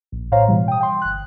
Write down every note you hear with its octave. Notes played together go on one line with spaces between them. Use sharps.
A#1
A2 C5 C#5 F5 A#5
B2 E3 G3
G5 D#6
G5 C6
G1 F#6